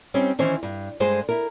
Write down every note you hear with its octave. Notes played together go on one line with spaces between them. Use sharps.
G3 C4 C#4 D#4
D#3 E3 C#4 C5
G2
G2 G#3 G#4 C5
E4 A#4